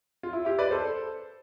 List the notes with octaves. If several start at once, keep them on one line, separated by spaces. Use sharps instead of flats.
F4
E4
E4 G4
B4 D5
A4 C5